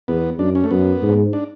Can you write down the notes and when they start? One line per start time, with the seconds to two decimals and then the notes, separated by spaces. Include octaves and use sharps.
0.08 E2 B3
0.39 F#2 D4
0.55 C#4
0.64 A3
0.71 F#2 B3
1.02 G#2
1.33 D4